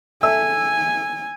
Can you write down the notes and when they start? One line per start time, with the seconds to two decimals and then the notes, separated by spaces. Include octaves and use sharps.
0.23 A4 E5 G#5 E6